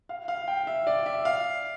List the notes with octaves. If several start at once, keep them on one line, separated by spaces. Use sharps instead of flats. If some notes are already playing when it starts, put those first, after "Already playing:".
F5
F5
G5
E5
D5
E5
F5